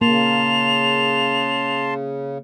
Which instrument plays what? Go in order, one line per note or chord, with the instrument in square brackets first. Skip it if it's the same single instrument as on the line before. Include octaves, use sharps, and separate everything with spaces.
[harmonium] C#3 [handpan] A#3 [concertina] A5 C6 [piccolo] F7